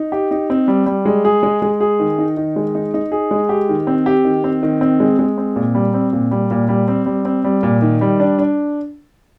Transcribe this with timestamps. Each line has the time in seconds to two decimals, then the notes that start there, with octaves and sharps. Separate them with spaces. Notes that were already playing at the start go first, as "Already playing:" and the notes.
Already playing: D#4
0.12 G4
0.31 D#4
0.50 C4
0.68 G3
0.86 G3
1.05 G#3
1.25 G#4
1.43 G#3
1.62 G#3
1.80 G#4
2.00 D#3
2.18 D#4
2.37 D#3
2.56 G#3
2.75 D#4
2.94 D#4
3.12 G#4
3.31 G#3
3.49 G4
3.69 D#3
3.87 C4
4.06 G4
4.25 D#3
4.44 C4
4.63 D#3
4.81 C4
5.00 G#3
5.19 G#3
5.38 C4
5.56 A#2
5.75 G3
5.94 C4
6.13 A#2
6.31 G3
6.51 A#2
6.69 G3
6.88 C4
7.06 G3
7.25 C4
7.44 G3
7.63 A#2
7.82 D#3
8.01 G3
8.20 D4
8.39 D4